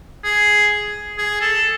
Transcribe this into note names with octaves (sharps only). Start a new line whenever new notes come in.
G#4
G#4
A4